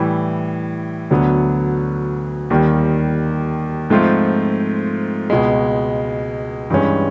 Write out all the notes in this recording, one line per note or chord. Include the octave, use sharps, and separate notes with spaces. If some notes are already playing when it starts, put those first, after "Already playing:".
Already playing: A2 E3 G3
D2 D3 F#3 B3
D#2 D#3 G3 A#3
G#2 F3 A3 C4 F4
C#2 B2 G#3
G2 E3 G#3 C#4